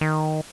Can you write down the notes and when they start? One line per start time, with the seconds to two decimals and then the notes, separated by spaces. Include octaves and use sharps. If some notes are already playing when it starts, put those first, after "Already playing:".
0.01 D#3